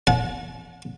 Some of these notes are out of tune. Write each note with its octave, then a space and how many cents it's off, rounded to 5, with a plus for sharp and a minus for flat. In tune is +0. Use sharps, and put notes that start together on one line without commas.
F#5 -40 A5 -45